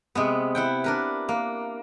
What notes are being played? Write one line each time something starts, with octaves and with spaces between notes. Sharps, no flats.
C3 G#3 B3
E4 F#5 G5
D4 A#4 B4
A#3